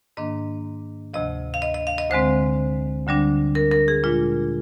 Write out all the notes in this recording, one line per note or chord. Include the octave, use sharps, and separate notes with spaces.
G#2 D#3 A#3 D4 D#5
D2 C3 F3 D#5
F5
D#5
D#5
F5
D#5
D2 D3 G#3 C4 C5
D2 D3 G3 D4
A#4
A#4
G#4
A#2 G#3 D4 F4